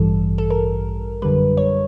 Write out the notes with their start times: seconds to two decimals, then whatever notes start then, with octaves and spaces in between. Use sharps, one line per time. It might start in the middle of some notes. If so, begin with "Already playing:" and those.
Already playing: A1 G2 E3 G3 A4
0.38 A4
0.50 A#4
1.22 F#2 D3 G3 B4
1.57 C#5